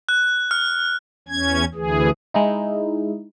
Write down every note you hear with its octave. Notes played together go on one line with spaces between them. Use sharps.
F#6
F6
E2 C#4 G#6
D2 E3 G#4
G#3 D#4 E4